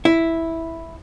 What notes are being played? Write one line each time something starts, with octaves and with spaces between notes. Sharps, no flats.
E4